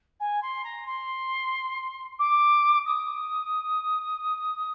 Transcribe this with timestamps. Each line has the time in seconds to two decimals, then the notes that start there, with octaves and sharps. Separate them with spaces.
0.19 G#5
0.42 C6
0.64 A#5
0.86 C6
2.19 D6
2.85 D#6